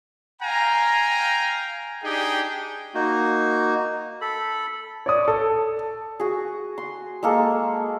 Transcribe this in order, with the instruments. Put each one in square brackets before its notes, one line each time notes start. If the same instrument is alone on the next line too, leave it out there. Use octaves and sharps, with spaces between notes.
[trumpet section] F5 G5 G#5 A#5
D4 D#4 G4 G#4 G5
[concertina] A#3 D#4 F#4
A4 B5
[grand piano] C#5 D5 D#6
A4
[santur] F#4 G#4
C6
G#3 A#3 A4